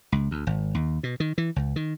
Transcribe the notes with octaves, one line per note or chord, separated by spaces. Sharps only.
C#2
D2
G#1
D#2
B2
D#3
E3
C#2
D#3